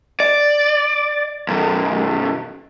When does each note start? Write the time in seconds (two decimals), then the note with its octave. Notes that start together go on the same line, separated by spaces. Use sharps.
0.20 D5
1.48 B1 F#2